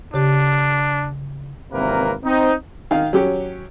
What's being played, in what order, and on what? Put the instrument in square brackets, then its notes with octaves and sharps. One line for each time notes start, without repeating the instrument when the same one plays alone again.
[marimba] C#3 G4 [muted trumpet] D4
[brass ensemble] G#1 E2 C3 A#3 A#4 B4
C4 D#4
[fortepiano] D#3 F5
F#3 C#4 G4